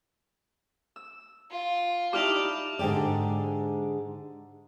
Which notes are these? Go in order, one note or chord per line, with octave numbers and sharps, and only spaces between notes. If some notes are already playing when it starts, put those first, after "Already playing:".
E6
F4
D#4 E4 G4 D5 A5 D6 F6 F7
G#2 D3 G#3 G4 D5